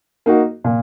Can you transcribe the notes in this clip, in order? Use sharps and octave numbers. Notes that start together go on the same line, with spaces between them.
A#3 D#4 F#4
A#2